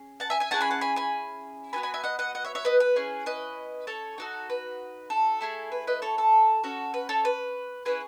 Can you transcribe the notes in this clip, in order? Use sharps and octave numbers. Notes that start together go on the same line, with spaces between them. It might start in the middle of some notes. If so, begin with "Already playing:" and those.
Already playing: C#4 G#4
F#5 A5
E5 G#5
E5 G#5
C#4 E4 G#4 F#5 A5
G#5 B5
F#5 A5
G#5 B5
G#5 B5
B3 F#4 A4 G#5 B5
G#5 B5
E5 G#5
D#5 F#5
D#5 F#5
D#5 F#5
C#5 E5
C#5 E5
B4 D#5
B4
C#4 E4 G#4
B4 D#5
A4 C#5
D#4 F#4 A4
B4
A4
A3 E4 G#4
B4
B4 D#5
A4 C#5
A4
C#4 F#4 A4
B4
A4 C#5
B4
C#4 E4 G#4 B4